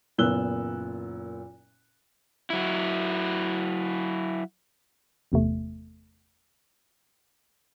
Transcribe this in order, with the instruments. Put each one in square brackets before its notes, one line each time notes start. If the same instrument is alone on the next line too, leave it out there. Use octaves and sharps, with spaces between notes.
[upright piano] F#1 A#2 B3 E6 F#6 G7
[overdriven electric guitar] F#3 E4
[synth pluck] G1 E2 C3 A3